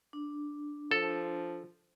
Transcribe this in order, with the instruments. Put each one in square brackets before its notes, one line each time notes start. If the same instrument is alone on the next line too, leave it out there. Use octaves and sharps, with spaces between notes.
[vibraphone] D4
[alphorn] F3 [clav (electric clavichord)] A4